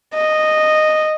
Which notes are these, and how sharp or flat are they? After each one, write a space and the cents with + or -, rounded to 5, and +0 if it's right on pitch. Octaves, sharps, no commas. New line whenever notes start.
D#5 -10